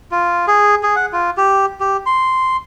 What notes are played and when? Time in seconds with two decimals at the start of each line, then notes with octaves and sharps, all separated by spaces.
0.11 F4
0.47 G#4
0.83 G#4
0.96 F#5
1.13 F4
1.37 G4
1.80 G4
2.06 C6